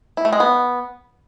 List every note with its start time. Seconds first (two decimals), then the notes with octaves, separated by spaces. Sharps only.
0.17 E4
0.25 A3
0.33 G#3
0.40 B3